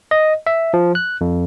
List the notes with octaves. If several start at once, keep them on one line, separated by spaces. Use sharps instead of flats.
D#5
E5
F3
F#6
F2